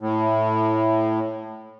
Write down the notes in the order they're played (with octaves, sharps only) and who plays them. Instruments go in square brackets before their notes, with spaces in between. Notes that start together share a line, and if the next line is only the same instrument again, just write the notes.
[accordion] A2